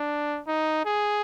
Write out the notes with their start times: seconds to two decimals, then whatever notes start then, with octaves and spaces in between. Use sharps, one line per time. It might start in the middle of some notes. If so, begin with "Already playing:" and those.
Already playing: D4
0.47 D#4
0.85 G#4